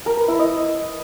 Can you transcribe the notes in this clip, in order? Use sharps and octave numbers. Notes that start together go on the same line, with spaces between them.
A#4
B4
E4
D#5